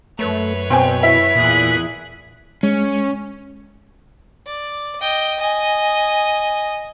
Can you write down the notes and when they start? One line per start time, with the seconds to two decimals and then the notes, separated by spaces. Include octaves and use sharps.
0.19 F#2 A3 B4 C#5
0.70 B2 C4 G5 G#5
1.03 E4 B6
1.35 E2 A#2 G#4 F#6
2.63 G#3 C#4
4.46 D5
5.01 D#5 G5
5.40 D#5 G#5